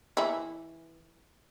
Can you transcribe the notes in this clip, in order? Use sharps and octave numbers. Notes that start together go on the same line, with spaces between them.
E3 E4